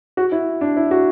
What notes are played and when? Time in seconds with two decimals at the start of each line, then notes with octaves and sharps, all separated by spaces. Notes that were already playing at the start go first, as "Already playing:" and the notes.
0.17 F#4
0.32 E4
0.61 D4
0.77 E4
0.91 F#4